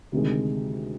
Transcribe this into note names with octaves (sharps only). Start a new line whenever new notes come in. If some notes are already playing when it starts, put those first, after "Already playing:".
D2 C3 D#3 G#3